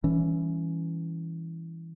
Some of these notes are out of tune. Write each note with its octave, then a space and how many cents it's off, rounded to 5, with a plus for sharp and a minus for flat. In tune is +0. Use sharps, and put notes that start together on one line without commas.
E3 +0 G3 +20 C#4 +15